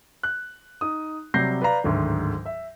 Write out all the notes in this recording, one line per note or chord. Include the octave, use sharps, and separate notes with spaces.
F#6
D#4 D#6
C3 F#3 G3 G6 A#6 C7
B4 D5 F5 A#5
D1 D2 G#2 D#3
E5